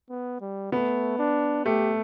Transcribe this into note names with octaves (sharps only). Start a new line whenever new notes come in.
B3
G3
A3 B3
D4
A3 G4